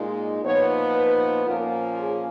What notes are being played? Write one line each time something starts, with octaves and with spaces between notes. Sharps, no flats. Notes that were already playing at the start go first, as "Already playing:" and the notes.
Already playing: A#2 G#3 D#4
A#2 F3 B3 D#4 C#5
B4
A#2 F3 A#3 C#4 A#4
G#4